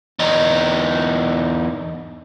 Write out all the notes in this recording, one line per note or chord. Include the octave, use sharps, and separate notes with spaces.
E2 D#4